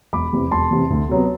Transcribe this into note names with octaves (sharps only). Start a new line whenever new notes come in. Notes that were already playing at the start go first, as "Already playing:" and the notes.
E1 B5 D6
E2 C3 E3
E1 A5 C6
E2 C3 E3
D2
C3 F#3 B3